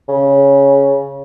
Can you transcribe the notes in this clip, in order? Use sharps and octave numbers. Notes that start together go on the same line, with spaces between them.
C#3